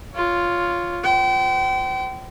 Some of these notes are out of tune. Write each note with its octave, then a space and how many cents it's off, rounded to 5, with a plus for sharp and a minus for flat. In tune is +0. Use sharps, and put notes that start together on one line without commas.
F4 +0 C#5 +15
C5 -30 G5 -35